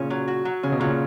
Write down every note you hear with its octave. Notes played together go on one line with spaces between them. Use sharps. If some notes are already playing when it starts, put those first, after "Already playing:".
Already playing: A#2 C#3 C#4
F#3
F#4
F#3
C#3 C#4
B2
A#2 C#3 F#3